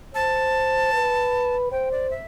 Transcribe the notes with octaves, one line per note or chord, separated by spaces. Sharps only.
C5 A5
B4
C5 G5
D5
E5